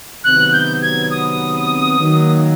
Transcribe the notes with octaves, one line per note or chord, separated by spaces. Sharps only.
C3 D#3 F#3 B3 F#6
G6
G#6
D#6
D#3 F#3 A#3